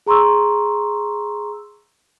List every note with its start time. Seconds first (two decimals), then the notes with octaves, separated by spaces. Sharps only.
0.06 G#4 A#5 C6 C#6 E6